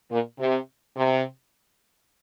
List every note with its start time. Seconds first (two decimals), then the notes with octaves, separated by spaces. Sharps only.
0.11 A#2
0.39 C3
0.96 C3